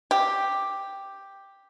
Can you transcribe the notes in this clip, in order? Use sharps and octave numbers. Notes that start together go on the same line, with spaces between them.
G4